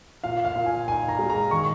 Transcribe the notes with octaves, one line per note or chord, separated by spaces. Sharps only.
A#2 F5
F5
A#2
G#5
D#4 G#5
A#5
G#3
A#5
D#3 C#6